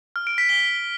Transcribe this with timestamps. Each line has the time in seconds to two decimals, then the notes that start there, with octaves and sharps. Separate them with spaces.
0.16 F6
0.27 D7
0.38 B6
0.49 G7